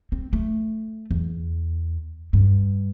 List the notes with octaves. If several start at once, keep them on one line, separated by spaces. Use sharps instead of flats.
C4
A3
E2
G2